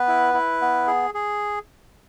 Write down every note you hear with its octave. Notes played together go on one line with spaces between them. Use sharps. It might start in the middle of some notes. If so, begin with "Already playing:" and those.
Already playing: B3 B4
E4
E4
B3
G#4
G#4